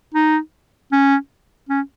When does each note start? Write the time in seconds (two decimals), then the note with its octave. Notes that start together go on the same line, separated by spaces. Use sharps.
0.14 D#4
0.92 C#4
1.69 C#4